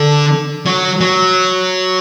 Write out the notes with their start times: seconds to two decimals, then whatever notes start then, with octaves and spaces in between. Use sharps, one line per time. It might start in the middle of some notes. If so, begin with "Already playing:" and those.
Already playing: D3
0.66 F#3
1.01 F#3